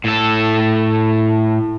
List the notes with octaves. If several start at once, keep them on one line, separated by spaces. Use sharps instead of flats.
A2 A4